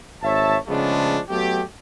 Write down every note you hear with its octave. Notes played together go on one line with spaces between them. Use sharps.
G#1 C#5 E5 A5
C#3 F3 G#3 A3 B3 D4
F#3 A3 B3 G4